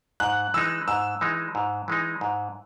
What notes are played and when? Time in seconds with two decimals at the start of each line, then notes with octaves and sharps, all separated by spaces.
0.20 G#2 F#6
0.54 E3 G#3 D#4 E6
0.88 G#2 E6
1.21 E3 G#3 D#4
1.55 G#2
1.88 E3 G#3 D#4
2.21 G#2